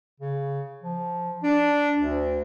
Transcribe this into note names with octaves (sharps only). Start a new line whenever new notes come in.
C#3
F3
D4
D2